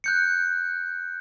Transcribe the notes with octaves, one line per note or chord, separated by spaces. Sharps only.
F#6 G6 C#7